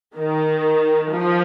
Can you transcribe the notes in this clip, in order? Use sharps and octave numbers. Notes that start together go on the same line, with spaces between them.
D#3
F3